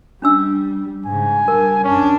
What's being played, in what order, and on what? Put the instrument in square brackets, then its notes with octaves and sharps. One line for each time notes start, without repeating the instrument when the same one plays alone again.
[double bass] G3 [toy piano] C#4 D4 E6
[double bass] G#2 C#3 [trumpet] G#5
[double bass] G3 D4 [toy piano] A#4
[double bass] F#2 D4 [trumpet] C#4